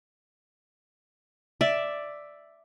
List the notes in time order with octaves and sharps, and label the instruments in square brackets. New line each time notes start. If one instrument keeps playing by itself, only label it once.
[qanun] D5 E5